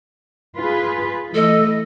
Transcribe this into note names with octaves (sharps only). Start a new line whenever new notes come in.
F4 G#4 B4
E3 A3 A4 D#5